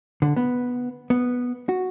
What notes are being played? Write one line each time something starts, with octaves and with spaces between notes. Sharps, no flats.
D3
B3
B3
F#4